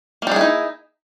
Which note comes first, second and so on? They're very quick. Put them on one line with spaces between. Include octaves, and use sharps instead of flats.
A#3 G3 G#4 E4 D#4